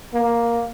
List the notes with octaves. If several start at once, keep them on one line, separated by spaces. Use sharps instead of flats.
A#3